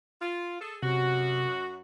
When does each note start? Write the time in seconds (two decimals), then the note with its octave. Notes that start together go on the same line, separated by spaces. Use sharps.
0.21 F4
0.61 G#4 A4
0.83 F#2 C3 F#4